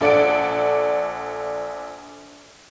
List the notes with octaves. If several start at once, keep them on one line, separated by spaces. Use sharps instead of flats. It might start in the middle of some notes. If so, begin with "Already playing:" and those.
A#1 A4 D5 F#5 D7